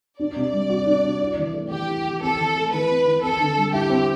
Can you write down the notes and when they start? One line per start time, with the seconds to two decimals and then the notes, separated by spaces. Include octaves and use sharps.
0.19 D4 D5
0.36 C3
0.53 G3
0.70 F#4
0.86 D4
1.04 C3
1.20 E4
1.38 E3
1.54 A3
1.70 E3 G4
1.88 E4
2.04 E3
2.22 C4 A4
2.38 E3
2.55 A3
2.71 E3 B4
2.89 C4
3.05 E3
3.22 C4 A4
3.39 D3
3.57 G3
3.73 E4 G4
3.90 C4